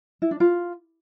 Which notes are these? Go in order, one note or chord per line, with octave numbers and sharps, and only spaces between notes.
E4
D4
F4